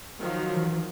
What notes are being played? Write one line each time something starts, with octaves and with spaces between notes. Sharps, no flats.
D#3 F3 F#3
E3